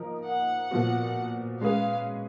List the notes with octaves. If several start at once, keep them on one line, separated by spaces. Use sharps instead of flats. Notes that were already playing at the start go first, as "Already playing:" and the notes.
Already playing: F3 A#3 D#4 A#4
F#5
A#2 F3 B3 F#4
G#3 C#4 G#4 B4 F5